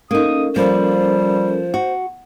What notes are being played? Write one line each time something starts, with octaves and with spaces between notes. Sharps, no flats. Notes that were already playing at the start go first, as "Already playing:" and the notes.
A#3 C#4 D#4 A4 A#4 D#6
F3 G3 A#3 C5
F#4